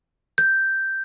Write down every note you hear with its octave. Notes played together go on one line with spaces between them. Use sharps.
G6